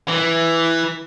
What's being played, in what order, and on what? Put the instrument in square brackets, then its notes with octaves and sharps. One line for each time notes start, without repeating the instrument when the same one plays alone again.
[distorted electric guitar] E3